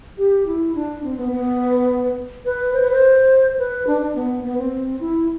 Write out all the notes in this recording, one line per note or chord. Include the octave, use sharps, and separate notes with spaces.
G4
E4
D4
C4
B3
B3
B4
C5
B4
C5
B4
D4
D4
B3
B3
C4
E4